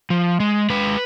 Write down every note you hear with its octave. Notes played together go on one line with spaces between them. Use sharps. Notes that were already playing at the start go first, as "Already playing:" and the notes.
F3
G#3
G#3 B4